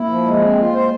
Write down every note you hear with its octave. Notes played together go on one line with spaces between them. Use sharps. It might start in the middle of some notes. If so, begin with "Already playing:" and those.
Already playing: A#3 E4
F3
G#3
C4
F4
C5